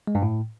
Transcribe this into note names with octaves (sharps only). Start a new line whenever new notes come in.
G#3
G2
A2